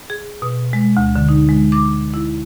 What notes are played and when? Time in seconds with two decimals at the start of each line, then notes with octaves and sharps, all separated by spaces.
0.10 G#4
0.42 B2
0.73 G#3
0.97 D2
1.16 D3
1.29 D#4
1.49 G#3
1.72 D6
2.14 E4